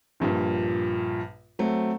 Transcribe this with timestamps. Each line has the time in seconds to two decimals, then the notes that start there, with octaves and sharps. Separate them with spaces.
0.20 A#1 G2 A#2
1.59 F#3 A3 C4